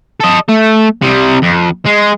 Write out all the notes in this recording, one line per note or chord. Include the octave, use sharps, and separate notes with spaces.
A4 D#5
A3
C3 G3
F2
G#3